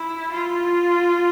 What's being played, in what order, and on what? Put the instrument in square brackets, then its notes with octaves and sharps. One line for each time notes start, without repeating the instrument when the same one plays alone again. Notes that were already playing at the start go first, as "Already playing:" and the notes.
Already playing: [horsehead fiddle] E4
F4